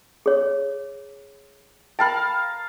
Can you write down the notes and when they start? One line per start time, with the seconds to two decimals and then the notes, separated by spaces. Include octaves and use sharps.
0.26 G#4 C#5
1.99 A#4 F5 G5 A5 B5